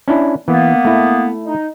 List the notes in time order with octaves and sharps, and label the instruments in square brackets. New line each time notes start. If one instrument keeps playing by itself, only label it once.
[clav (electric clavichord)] C#4 D4 E4
[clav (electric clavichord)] E3 [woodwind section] A#3 B3
[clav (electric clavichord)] A3 E4
[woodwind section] D#4